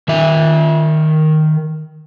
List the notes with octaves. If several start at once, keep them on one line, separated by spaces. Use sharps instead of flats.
D#3 E5